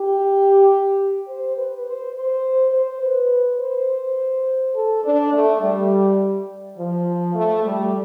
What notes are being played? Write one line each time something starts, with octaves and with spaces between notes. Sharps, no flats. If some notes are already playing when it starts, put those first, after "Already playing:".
Already playing: G4
C5
B4
C5
C5
C5
B4
C5
A4
D4
A3
G3
F3
A3
G3